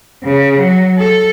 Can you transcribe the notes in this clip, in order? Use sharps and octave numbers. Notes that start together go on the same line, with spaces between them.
C#3
F#3
A4